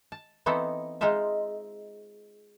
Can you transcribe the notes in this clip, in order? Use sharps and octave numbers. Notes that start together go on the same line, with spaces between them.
A5
E3 B3 C4 D#4 A4
G#3 D#4 F4 C5 E5